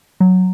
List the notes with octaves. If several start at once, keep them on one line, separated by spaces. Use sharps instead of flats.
F#3